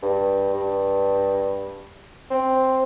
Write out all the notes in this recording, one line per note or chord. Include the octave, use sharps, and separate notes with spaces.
G2
G2
C4